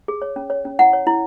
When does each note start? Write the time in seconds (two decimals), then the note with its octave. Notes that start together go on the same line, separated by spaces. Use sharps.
0.08 G#4
0.22 C#5
0.36 C#4
0.50 C#5
0.65 C#4
0.79 E4 F#5
0.93 C#5
1.07 E4